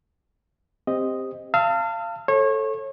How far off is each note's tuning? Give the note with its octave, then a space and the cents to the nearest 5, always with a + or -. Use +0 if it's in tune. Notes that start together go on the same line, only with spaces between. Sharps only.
C4 +0 G4 +15 D#5 +0
F5 -25 A5 +35 E6 -35
A4 +0 C#5 -30